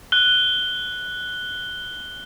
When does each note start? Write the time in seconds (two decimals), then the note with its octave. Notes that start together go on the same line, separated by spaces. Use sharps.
0.12 F#6 G7